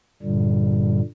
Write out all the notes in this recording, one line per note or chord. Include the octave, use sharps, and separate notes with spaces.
G2 A#2 D3 G3